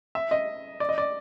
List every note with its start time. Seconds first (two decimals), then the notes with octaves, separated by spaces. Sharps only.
0.15 E5
0.31 D#5
0.80 D5
0.89 D#5
0.98 D5